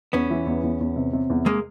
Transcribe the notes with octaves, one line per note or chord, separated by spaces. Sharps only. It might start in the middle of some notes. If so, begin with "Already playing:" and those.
E2 B3 C#4
E3
E2
E2
E2
C3
C3
E2
G#3 A#3